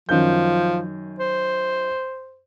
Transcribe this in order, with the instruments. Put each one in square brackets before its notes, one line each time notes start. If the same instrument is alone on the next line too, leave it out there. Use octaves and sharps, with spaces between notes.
[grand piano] F#2 D#3 G6 [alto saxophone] F3
[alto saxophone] C5